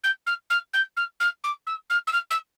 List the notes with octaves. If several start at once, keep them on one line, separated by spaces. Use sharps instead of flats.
G6
F6
F6
G6
F6
F6
D6
E6
F6
E6
F6
E6